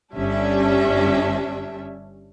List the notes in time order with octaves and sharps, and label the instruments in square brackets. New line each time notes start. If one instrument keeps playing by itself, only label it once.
[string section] G1 G3 C#4 D4 E5